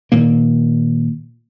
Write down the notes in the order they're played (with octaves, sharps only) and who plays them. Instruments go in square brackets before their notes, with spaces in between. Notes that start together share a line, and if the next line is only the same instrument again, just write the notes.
[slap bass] A#2 D#3 A#3